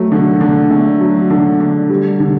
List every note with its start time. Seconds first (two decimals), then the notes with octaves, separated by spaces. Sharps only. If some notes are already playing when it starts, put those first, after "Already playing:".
Already playing: F#3 A3
0.12 D3
0.41 D3
0.70 A3
1.00 F#3
1.30 D3
1.60 D3
1.89 G3
2.20 D3